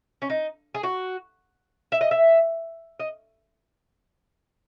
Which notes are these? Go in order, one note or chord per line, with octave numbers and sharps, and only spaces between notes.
C#4
D#4
G#4
F#4
E5
D#5
E5
D#5